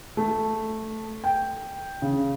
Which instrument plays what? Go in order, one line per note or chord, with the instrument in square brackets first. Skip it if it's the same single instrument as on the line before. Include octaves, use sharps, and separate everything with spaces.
[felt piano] A3
G5
C#3